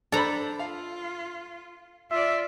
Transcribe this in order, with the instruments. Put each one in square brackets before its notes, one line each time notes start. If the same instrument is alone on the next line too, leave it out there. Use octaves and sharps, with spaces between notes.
[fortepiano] D4 C5 B5 [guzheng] A4 A#5
[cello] F4 [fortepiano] F5
[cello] F4 D5 [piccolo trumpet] E5